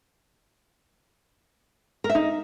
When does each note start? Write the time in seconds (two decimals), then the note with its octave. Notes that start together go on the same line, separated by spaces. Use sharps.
2.04 A#4
2.10 E5
2.15 D#4